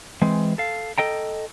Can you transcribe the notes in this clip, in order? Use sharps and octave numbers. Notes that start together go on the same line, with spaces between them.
E3 G#3 C4
A4 F5
A4 D#5 G5 A#5